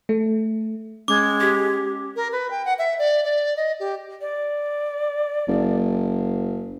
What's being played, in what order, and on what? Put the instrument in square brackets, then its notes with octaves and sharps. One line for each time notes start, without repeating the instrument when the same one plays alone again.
[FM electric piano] A3
[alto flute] G#3 [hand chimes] C#4 [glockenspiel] D6
[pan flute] G4
[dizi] A#4
B4
G5
F#5
E5
D5
D5
D#5
G4
[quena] D5
[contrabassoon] F#1